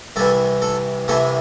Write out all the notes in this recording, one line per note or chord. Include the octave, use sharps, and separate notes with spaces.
C2 C3 E3 A4
A4
C2 C3 E3 A4